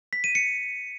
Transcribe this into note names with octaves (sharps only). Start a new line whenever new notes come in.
B6
D#7
C#7